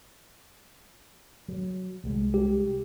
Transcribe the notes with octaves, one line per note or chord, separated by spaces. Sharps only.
F#3
C2 G3 G#3
G4